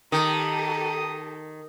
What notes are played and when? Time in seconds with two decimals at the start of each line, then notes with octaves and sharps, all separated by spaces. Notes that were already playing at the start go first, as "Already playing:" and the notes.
0.12 D#3 G4 A4 A#5 D#6